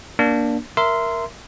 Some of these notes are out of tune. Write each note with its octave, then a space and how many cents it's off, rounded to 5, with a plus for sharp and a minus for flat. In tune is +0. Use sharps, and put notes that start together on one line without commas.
A#3 +20 D4 +0
A#4 +0 E5 +5 C6 -15